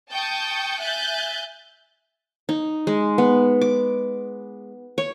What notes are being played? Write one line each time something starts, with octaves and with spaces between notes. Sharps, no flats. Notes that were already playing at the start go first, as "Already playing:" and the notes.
G5 A5 C#6 D#6 G6
E5 G#5 F#6 G6 A6
D#4
G#3
B3
D6
C#5